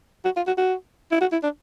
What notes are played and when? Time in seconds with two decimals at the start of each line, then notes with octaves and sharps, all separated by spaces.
0.25 F#4
0.36 F4
0.47 F#4
0.58 F#4
1.12 E4
1.21 F#4
1.32 E4
1.43 D4